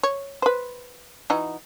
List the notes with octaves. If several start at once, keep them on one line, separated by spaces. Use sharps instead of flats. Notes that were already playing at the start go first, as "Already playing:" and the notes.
C#5
B4 C5
E3 D#4 F#4